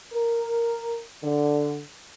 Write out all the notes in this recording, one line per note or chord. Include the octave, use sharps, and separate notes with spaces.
A#4
D3